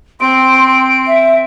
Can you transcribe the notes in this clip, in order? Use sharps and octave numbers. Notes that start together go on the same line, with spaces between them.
C4 C6 D7
E5